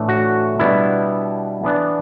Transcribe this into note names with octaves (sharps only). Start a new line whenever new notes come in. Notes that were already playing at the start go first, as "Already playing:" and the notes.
Already playing: A2 E3 A3 D4
F#4
B2 G3 B3 D4 E4
E3 B3 D4